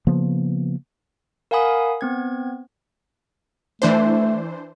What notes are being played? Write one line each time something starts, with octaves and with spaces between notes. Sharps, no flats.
C#3 F3 A#3 B3
A#4 F5 F#5 G#5 B5 D#6
B3 C4 G#6
E3 A3 D4 C5